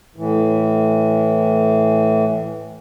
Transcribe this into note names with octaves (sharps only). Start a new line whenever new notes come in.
A2 E3